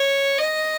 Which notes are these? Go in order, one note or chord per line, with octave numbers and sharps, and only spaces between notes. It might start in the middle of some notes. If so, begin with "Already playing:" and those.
Already playing: C#5
D#5